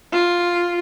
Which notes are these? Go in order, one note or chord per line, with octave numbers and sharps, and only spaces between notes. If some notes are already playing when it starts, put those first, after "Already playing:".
F4